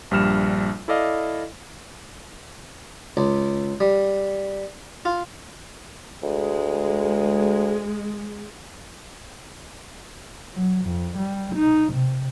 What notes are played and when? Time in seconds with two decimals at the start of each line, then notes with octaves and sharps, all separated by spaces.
0.11 A#1 G2 G3 F6 E7
0.88 E4 A4 D5 D#5 F5
3.17 C#2
3.80 G3
5.05 F4
6.23 D2 G#3
10.54 F#3
10.86 F2
11.17 G3
11.55 D#4
11.93 C3